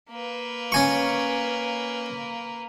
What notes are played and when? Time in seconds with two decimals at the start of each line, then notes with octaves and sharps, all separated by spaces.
0.10 A#3 B4
0.72 C#4 G#5 C#6